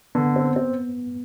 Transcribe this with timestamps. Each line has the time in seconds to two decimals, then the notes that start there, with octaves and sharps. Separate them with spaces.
0.15 D3 B3
0.36 C4
0.56 C4